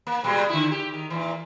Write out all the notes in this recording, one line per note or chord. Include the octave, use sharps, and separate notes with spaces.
A#3
A#2 G3 G#3
D3 E4
G4
D#3
A#2 E3